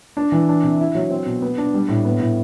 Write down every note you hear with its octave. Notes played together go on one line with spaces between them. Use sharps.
D4
E3
D4
C3
E4
F#3
C4
B2
B3
D4
G3
A2
B3
A2